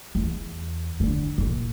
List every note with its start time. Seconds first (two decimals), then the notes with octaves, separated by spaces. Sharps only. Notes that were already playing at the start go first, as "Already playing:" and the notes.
0.15 E2
1.00 D3
1.38 A#2